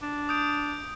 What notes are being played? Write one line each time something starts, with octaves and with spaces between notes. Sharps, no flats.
D4
D#6 G6 D7